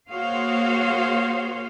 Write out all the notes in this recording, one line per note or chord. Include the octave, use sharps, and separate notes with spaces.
A#3 F#4 G#4 C5 C#5 F5